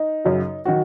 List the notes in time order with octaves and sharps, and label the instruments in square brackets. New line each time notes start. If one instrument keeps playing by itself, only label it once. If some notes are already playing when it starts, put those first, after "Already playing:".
Already playing: [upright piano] D#4
F#2 C#3 F#3
D#3 F#3 F#4